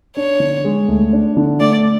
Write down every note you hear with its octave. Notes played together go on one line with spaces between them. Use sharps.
D4 C#5
D3
G#3
D2
D4
D3
A3 D5